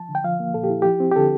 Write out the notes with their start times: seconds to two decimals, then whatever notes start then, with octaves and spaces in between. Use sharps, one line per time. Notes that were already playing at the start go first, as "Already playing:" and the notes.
Already playing: F3 A5
0.09 D3
0.15 G5
0.24 F3 F5
0.40 A#3
0.54 A#2 A4
0.63 G4
0.70 E4
0.82 F3 G4
1.00 C4
1.11 G4
1.16 D3 A4